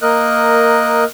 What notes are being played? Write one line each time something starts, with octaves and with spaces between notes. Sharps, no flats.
A#3 A#4 D#5 F#6